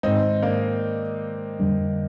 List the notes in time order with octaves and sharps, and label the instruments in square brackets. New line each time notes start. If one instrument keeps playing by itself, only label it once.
[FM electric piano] G#2 D#3 G#3 [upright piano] C4 D#4
[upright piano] A#3 D4
[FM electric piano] F2 D3 G3 D4